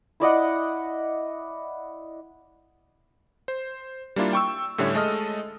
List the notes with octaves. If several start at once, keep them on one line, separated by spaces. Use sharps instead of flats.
E4 D5 D#5 F#5
C5
G3 A#3 D4 E4 F4
G5 C#6 E6
A2 D3 G3 C#4 C#5 E5
G#3 A3 A4 D#5 D#6 F6